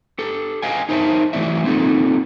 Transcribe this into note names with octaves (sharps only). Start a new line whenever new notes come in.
G4 A4
B4 D#5 F5 G5 G#5
D#4 A#4 C5 C#5 E5 A5
E3 F#3 A3 E4 D5 E5
A#3 C4 D#4 F4 A4